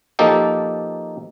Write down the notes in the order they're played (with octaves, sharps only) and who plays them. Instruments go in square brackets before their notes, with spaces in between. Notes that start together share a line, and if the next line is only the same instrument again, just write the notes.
[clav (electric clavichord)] F3 A#3 D#4 G4 A4